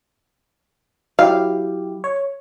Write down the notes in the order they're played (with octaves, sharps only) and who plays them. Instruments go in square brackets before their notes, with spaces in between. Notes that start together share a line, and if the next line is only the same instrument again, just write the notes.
[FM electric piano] F#3 E4 G4 [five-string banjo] F5
[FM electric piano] C#5